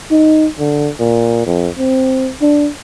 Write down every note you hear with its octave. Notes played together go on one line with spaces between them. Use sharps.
D#4
D3
A#2
F2
C4
D4